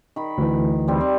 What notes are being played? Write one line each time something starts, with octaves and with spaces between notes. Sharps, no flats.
D#3 B5
D2 E3
G3 C4
C4